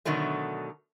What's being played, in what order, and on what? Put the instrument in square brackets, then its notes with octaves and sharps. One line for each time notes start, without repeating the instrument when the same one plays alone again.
[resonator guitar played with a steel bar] B2 D3 D#3 F#3 A3